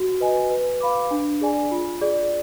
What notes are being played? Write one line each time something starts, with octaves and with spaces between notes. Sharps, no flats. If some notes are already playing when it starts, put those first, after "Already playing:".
Already playing: F#4
B4 D#5 G#5
B4
F5 B5 D6
D4
G#4 D5 G#5
F4
G#4 D5